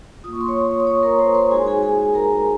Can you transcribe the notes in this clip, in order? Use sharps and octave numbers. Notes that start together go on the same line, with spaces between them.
A#3 F4 D#6
C#6
C6
C#5 C#6
D#6
C#5 C#6
A#4 A#5
C5 C6
C5 C6
G#3 D#4 F#4 G#4 G#5
G#4 G#5
G#4 G#5
A#4 A#5